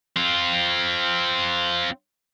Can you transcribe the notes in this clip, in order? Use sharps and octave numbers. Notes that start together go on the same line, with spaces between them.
C4 F4